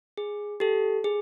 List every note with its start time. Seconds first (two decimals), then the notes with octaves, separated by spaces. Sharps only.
0.17 G#4
0.60 G4 A4
1.04 G#4